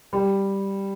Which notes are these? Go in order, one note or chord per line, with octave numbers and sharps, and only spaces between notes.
G3